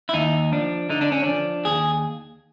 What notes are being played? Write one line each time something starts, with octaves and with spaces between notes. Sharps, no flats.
E4
D#2 D#4
F3 D4
D3 D#4
D4
C#4
F3 D4
D#2 G#4